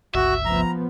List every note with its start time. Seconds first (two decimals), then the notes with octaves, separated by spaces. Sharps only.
0.15 G1 C#2 F#4 E5
0.45 F3 B3 A#5